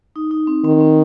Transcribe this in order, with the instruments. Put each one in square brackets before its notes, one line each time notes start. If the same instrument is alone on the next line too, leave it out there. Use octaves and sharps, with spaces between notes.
[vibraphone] D#4
D#4
C4
[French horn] D#3 [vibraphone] C4
[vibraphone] C4